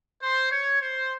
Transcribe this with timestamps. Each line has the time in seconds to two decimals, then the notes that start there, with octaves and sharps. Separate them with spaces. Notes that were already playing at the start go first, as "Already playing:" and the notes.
0.22 C5
0.51 C#5
0.82 C5